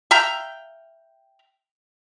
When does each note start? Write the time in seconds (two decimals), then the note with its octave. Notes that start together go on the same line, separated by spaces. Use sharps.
0.11 E5 F5 G5 A#5